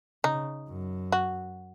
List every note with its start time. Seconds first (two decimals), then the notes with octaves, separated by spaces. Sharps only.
0.24 C#3 D#4
0.69 F#2
1.12 F#4